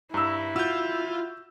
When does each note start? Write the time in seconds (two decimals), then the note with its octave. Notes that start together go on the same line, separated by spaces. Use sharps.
0.14 G2 E4 A#5 E6
0.56 F4 F#4 E6 G6